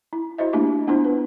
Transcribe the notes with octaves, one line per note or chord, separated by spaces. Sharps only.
E4
E4 F#4 C5 D#5 E5
A3 A#3 D4 E4 G4 E5
B3 D4 E4 F4 C5
B4